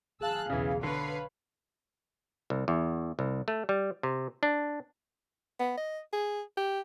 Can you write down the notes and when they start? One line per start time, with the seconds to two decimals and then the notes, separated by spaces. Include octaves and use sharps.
0.21 G#4 F5 A5 E6 F#6
0.50 B1 E2 C#3 E3
0.83 D3 B4 C#5 F5 C7
2.50 C2
2.68 E2
3.19 C2
3.48 A3
3.69 G3
4.03 C3
4.43 D4
5.59 B3
5.77 D#5
6.13 G#4
6.57 G4